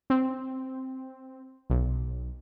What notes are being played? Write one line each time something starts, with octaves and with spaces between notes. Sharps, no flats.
C4
B1